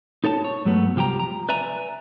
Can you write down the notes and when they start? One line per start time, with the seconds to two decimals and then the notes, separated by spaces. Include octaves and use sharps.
0.24 D#4 A4 C#5 A5
0.45 C#5
0.65 G2 F#3 G#3 A3 B3
0.96 C2 F3 G4 G5 A#5
1.20 A#5
1.49 B4 D5 E5 G#5 A#5